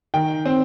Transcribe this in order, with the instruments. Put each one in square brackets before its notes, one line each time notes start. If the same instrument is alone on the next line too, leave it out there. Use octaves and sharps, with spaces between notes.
[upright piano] D#3 G5
C4